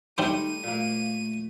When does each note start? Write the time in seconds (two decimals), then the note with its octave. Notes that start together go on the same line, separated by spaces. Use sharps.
0.18 D#3 G3 A3 D4 D#4 C5 D#7
0.64 A#2 A3 A#3